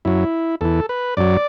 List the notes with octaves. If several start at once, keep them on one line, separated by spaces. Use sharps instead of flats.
F#2 F#3 E4
E2 E3 A4
B4
F#2 F#3 D5